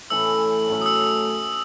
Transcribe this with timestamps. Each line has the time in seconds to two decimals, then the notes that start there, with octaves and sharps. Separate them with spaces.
0.10 A2 E3 A3 C#4 E6
0.67 A2 F#3 A3 C#4
0.82 D#6
0.86 E6